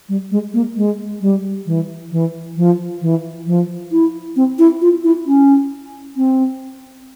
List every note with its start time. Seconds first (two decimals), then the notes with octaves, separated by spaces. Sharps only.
0.09 G3
0.31 G#3
0.54 A#3
0.77 G#3
1.21 G3
1.66 E3
2.11 E3
2.57 F3
3.01 E3
3.47 F3
3.92 E4
4.36 C4
4.59 E4
4.82 F4
5.04 E4
5.27 C#4
6.17 C4